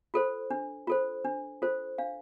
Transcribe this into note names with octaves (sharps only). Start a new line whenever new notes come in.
F4 A4 C5
D4
F4 A4 C5
D4
F4 A4 C5
D4 F5